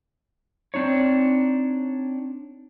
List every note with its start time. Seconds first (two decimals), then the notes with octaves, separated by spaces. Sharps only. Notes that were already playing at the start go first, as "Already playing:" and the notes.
0.74 C4 D4 D#4 C#5